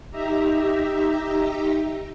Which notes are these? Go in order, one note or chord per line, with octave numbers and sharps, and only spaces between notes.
D#4 G4 E5 A#5